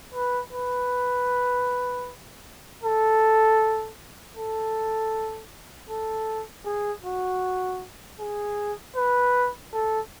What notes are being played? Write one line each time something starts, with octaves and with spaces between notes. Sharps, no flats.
B4
B4
A4
A4
A4
G#4
F#4
G#4
B4
A4